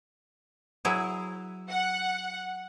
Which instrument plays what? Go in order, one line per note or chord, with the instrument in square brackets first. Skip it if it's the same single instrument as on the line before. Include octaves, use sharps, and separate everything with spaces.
[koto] F#3 E4 G#4
[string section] F#5